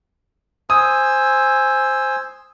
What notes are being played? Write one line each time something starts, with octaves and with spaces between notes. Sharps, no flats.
C5 G#5 D#6 E6